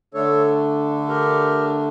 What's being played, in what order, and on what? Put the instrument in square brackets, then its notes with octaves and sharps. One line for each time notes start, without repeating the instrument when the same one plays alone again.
[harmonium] D3 A3 D4 A4 C#5
G4 A#4